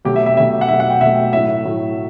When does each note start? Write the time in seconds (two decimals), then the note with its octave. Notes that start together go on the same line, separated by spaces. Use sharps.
0.05 B2 F#3 A3 G4
0.16 E5
0.26 E5
0.37 B2 F#3 A3 E5
0.61 F#5
0.68 B2 F#3 A3 E5
0.80 F#5
0.90 G5
1.01 B2 F#3 A3 E5
1.33 A2 F#3 A3 E5
1.65 A2 F#3 A3